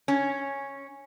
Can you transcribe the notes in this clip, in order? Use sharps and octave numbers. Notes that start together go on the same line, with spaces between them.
C#4